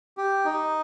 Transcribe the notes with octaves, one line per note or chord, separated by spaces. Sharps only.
G4
D#4